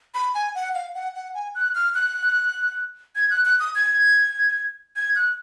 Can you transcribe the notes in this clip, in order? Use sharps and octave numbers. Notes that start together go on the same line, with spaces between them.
B5
G#5
F#5
F5
F#5
F#5
G#5
F#6
F6
F#6
G#6
F#6
F#6
D#6
G#6
G#6
F#6